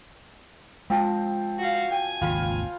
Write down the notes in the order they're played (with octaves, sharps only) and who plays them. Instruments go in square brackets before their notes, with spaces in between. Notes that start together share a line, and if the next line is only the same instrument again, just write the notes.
[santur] F3 C4 [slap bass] G#3
[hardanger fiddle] F#4 F5
[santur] G5 [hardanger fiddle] G#5
[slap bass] G#1 D#2 C#3 [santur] F4 F5 B5